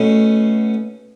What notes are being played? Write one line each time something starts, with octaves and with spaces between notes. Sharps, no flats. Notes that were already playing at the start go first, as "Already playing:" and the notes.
Already playing: B2 A3 C#4